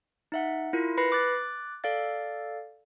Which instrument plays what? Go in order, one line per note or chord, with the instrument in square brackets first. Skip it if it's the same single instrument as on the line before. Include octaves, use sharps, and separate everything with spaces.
[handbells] D#4 E5 F#5
E4 F4 A#4
B4 B5 A#6 C7
D6 F#6 A6
A4 D5 F5 A6